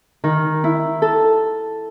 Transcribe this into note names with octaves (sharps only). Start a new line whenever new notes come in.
D#3
E4
A4